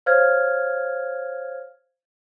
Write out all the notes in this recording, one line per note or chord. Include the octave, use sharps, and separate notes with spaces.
C5 C#5 F5 F6 G#6